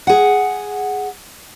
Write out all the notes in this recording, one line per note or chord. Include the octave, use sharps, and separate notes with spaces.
G#4 F#5